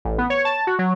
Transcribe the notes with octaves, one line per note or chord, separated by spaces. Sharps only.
A1
B3
C#5
A5
F#4
F#3